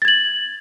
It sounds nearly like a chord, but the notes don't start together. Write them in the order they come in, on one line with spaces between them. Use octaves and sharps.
A6 G#6 F#7